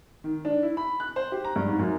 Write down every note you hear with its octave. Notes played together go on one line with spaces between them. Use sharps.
D#3
D4
E4
B5
F#6
C5
G4
A#5
G2
G#2
F#2